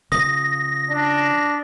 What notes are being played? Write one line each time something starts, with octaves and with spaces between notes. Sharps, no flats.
C#3 F3 D#6 A#6
D4